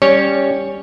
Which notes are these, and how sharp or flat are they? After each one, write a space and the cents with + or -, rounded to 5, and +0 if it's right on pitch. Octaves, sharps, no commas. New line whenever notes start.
G3 +10 C#4 +0 C#5 -5